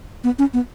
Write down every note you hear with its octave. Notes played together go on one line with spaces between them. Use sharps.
B3
C#4
B3